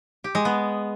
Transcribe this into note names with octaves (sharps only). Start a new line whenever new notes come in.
G4
G#3
B3